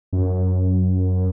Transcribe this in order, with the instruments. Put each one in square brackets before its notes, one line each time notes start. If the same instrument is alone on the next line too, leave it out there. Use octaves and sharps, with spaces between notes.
[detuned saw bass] F#2